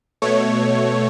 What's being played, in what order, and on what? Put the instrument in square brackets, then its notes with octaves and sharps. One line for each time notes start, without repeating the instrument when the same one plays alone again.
[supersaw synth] B2 A3 C#5